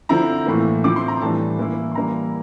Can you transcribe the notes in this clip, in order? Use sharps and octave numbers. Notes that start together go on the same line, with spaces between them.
D3 F3 C4 E4 A#5
A2 E3 A#3
D3 F3 C4 E4 D6
C6
A#5
A2 E3 G3 D4 A5
E3 A#3 E4
C6
E3 G3 A#3 E4 A#5